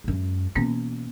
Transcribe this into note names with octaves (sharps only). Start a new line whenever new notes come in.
F#2 G#3
B2 E3 A#3 B3 C#4